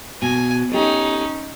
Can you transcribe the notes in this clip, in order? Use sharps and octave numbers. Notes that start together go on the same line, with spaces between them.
B2 G#5
C#4 D#4 G4 A4